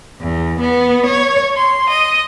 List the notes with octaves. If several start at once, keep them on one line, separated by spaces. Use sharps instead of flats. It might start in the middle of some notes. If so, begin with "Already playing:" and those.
E2
B3
C#5
C6
D#5